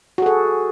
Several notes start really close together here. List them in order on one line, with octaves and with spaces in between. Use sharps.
F#4 G#4 A4